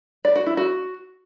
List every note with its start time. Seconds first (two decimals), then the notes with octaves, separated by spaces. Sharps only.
0.25 D5
0.36 F#4
0.46 E4
0.57 F#4